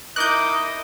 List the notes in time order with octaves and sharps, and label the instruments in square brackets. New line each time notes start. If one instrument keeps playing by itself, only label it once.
[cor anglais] D#4 [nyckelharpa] E4 D#5 [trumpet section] A#4 D6 [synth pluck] F#6 G6